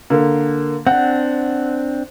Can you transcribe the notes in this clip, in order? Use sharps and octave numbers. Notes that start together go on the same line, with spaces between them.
D3 A#3
C4 D4 F#5